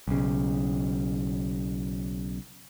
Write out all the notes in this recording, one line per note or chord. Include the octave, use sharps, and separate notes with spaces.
B1 C#3